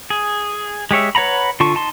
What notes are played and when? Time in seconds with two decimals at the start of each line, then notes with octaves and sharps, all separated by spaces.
0.10 G#4
0.91 G#3 G4 C#5 E5
1.15 B4 C#5 F#5 A#5 B5
1.60 D3 F4 A5 C#6
1.75 D#4 A5 C6